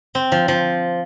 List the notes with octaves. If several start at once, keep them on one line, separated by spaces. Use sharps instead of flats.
C4
F3
F3